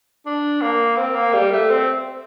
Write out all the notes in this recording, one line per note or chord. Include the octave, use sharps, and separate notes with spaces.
D4
A#3
C4
A#3
G3
A3
C4